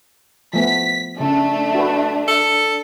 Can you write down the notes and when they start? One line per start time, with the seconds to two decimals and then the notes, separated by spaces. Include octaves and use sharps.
0.53 F3 A3 B3 B6
1.20 C#3 A3 D4
1.75 F#4 B4
2.28 A4